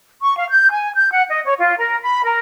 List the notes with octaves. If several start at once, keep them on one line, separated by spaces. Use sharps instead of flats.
C#6
F5
G6
G#5
G6
F#5
D#5
C#5
F4
A#4
B5
A#4